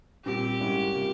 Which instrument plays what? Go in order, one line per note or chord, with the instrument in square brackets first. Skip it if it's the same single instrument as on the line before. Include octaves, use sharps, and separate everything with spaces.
[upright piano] A#2 G3 C4 [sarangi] G4
[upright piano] G#2 G3 A#3 C#4 E4
C3 G3 A#3 F4